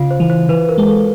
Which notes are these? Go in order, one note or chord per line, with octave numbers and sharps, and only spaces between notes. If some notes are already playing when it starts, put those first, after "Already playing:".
Already playing: C#3 F4 F5
C5
E3
C5
E3 B4
A#4
G#3
A4